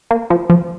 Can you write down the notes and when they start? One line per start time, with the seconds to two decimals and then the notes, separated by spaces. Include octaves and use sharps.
0.11 A#3
0.30 F3
0.50 F3